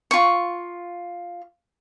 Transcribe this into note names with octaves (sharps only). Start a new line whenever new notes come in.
F4 C#6